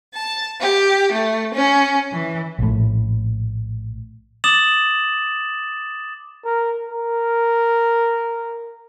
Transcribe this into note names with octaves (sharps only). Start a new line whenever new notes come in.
A5
G4
A3
C#4
E3
A#1 A2
D6 D#6 A6 E7 F#7
A#4
A#4